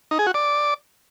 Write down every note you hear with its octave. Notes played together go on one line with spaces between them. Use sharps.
D#4
G#4
F#4
D5